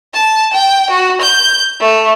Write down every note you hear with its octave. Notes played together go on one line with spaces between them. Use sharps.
A5
G5
F#4
G6
A3